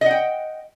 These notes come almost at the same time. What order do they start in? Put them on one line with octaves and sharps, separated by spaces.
D#5 F#5 G5